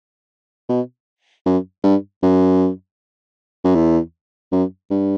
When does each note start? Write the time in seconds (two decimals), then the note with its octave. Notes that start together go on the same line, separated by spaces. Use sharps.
0.69 B2
1.46 F#2
1.84 G2
2.23 F#2
3.64 F#2
3.75 E2
4.52 F#2
4.90 G2